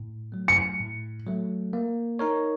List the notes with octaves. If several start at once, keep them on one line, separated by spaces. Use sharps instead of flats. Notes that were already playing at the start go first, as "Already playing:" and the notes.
Already playing: A2
F#3 A3
C#7
A2
F#3 A3
A#3
D#4 A#4 C#5